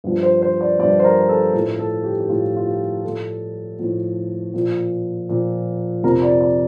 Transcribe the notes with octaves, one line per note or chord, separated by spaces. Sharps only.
G2 F3
C5
C5
D5
G2 F3 D5
C5
A#4
A4
A2 F3 A4
A4
G4
G4
A2 F3 F4
F4
G4
A2 F3 A4
A2 F3
A#2 F3
A#2 F3
F2 C3 F3 A#4
D5
D5